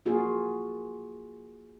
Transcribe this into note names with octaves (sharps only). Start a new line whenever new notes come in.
A#3 F4 F#4 G#4